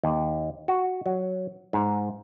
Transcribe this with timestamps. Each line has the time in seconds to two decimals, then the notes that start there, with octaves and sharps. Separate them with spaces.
0.03 D#2
0.68 F#4
1.06 F#3
1.73 G#2